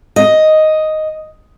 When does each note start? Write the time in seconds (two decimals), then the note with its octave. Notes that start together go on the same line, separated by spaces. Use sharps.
0.16 D#5